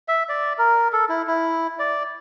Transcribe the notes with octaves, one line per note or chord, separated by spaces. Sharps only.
E5
D5
A#4
A4
E4
E4
D5